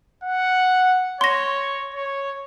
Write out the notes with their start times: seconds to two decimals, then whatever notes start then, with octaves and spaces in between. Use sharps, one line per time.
0.24 F#5
1.21 C#5 C6 A#6
1.95 C#5